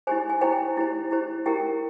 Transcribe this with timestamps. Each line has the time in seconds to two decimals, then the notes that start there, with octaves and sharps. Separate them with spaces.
0.07 E4 G4 C5 G#5
0.30 G#5
0.41 E4 G4 C5 G5
0.77 E4 G4 C5
1.11 E4 G4 C5
1.46 E4 G4 A#4 G5